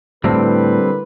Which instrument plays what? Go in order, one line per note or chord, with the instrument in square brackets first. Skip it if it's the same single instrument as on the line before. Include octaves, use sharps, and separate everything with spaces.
[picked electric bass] A2 [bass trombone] D3 [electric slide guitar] G3 C4 [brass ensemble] E4 A#4 B4